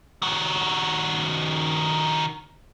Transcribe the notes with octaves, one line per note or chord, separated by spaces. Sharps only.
D#3 F#4